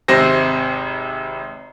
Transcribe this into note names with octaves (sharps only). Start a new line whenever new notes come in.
G#1 C3 C5 A#6